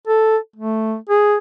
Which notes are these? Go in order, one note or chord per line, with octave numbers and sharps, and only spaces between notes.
A4
A3
G#4